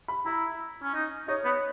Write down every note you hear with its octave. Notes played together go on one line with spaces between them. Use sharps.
B5
E4 A#5
C#4
D#4
D#4 C#5
B3